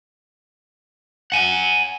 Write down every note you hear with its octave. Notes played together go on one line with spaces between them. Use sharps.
F#5 G#5